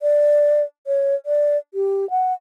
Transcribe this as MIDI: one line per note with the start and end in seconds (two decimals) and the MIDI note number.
0.02 0.63 74
0.87 1.15 73
1.26 1.57 74
1.74 2.09 67
2.10 2.33 78